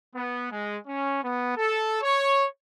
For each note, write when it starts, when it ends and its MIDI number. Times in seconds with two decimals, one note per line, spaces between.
0.14 0.48 59
0.52 0.77 56
0.87 1.21 61
1.23 1.55 59
1.56 1.99 69
2.01 2.45 73